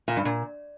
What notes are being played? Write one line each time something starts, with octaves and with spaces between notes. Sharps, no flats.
A#2
G2
A#2